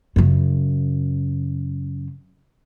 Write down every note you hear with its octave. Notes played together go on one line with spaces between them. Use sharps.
F#2 C#3